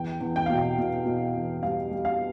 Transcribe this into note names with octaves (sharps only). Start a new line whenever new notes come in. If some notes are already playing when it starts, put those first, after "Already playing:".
Already playing: E2 G5
E2
G5
B2 F5
G5
B2
B2
E2
G3 F5
G3
F5